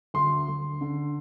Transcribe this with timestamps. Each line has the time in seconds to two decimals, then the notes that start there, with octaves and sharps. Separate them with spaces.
0.14 D2 C6
0.48 D2
0.81 D3